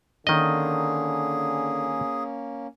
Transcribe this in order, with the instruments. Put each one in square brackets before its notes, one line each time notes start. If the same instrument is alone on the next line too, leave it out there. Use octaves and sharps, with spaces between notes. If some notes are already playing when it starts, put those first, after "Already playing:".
[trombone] D3 [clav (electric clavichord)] D#3 D#5 [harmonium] A#3 C#4 [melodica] G#4